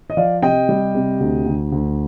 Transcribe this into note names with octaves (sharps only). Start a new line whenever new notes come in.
D#5
F3 D5 F5
C3 D#5 G5
G3
C3
D2
D2
D2